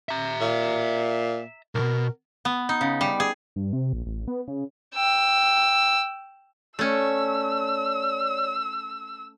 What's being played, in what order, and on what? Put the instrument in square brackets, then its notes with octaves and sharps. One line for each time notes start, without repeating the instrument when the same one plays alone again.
[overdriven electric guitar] E5 A#5
[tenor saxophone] A#2
[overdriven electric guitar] B1 B2 [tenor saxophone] A#4
[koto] B3
D#4
C#3
G3
G#4
[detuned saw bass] G2
C3
A#1
A1
B3
C#3
[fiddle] G5 E6
[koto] A3 C#4 [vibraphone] C#5 D5 [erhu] E6